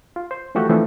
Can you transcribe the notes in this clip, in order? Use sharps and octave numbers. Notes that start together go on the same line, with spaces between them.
F4
C5
E3 F3 A3 F#4 G4 A4
E3 F3 A3 C4 D4